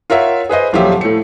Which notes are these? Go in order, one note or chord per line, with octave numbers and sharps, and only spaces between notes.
F4 A#4 C#5 E5 F#5
G#4 B4 C5 D#5
D#1 F3 F#3 G4 E5
A2 A3 C#7